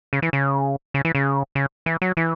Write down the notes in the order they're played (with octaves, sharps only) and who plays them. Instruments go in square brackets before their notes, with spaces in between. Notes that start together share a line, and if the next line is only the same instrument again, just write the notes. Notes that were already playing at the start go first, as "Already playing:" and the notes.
[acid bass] C#3
E3
C#3
C#3
E3
C#3
C#3
E3
F#3
E3